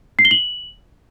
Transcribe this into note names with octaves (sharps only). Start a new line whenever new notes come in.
C7
G7
F#7